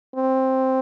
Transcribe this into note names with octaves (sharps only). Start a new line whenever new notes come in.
C4